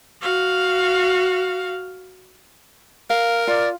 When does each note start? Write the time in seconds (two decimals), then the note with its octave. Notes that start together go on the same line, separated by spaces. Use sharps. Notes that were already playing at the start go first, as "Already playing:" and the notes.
0.22 F#4 F5
3.10 A#4 F5
3.47 F4 D5